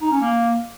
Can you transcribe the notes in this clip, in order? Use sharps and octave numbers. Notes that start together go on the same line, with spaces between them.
D#4
C#4
A#3